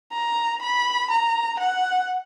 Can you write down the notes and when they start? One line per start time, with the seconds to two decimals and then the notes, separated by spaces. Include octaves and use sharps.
0.13 A#5
0.62 B5
1.10 A#5
1.60 F#5